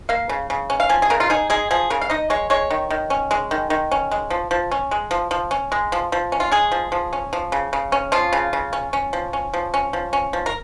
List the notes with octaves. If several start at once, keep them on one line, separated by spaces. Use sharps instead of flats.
A#3 F5
C#3
C#3
C#4
F5
F3 G#5
G#4
C#3 A#4
F4
D#4 G#4
G#3 G#4
F3 G#4
C#3 A#4
F5
D#4 D#5
G#3 C#5
G#3 C#5
D#3
D#3
C#4
G#3
D#3
D#3
C#4
G#3
F3
F3
C#4
G#3
F3
F3
C#4
G#3
F3
F3
C#4
F4
G#3 G#4
F3
F3
C#4
F3
C#3
C#3
C#4
F3 F4
C#3
C#3
C#4
C#4
F3
C#4
F3
C#4
F3
C#4
F3
A#4